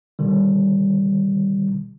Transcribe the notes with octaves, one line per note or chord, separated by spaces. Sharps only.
B2 D3 D#3 G3